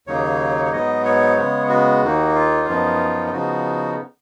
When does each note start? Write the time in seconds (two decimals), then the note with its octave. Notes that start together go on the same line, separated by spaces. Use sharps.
0.07 D#2 C#3 F#3 A#3 D#4 C#5
0.66 C#5
0.72 G#2 F#3 B3 D#4 D#5
1.05 C#5
1.38 C#3 G#3 B3
1.69 F#4
2.02 D#2 D#3 A#3 D#4
2.35 F4
2.67 F#2 F3 B3 D#4
3.27 F4
3.32 C#3 F3 B3 D#4 F#4